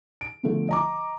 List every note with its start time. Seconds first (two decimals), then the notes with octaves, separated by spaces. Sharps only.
0.21 D7
0.43 B2 D3 F3 A3
0.69 D#5 A#5 D6